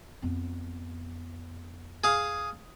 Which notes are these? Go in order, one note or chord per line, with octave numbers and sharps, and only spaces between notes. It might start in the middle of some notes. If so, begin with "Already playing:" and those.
F2 B3
G#4 F5